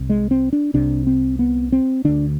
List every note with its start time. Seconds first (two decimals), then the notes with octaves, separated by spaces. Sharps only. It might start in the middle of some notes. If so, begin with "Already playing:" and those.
Already playing: C2 C3
0.10 G#3
0.31 C4
0.53 D4
0.74 C2 C3 D4
1.07 C4
1.39 B3
1.72 C4
2.04 D2 D3 D4